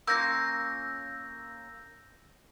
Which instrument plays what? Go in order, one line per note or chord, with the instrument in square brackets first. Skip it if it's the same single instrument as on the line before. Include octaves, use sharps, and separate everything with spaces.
[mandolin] A#3 C#4 F4 [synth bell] E6 G6 A#6